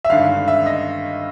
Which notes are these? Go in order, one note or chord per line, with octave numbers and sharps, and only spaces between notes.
E5
G#1 G2 D3 F5
E5
D#5